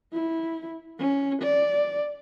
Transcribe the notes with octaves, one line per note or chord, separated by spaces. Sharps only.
E4
C#4
D5